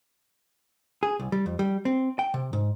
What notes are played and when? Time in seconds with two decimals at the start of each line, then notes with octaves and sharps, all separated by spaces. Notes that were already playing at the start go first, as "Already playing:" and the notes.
1.03 G#4
1.19 C2
1.32 G3
1.46 F2
1.59 G3
1.85 C4
2.19 G5
2.34 C3
2.53 G#2